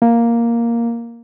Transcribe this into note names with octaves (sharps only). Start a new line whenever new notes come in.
A#3